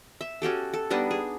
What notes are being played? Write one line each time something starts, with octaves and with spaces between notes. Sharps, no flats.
E5
C#4 F#4 G4 A4
A4
G3 B3 D4 D#4
G#4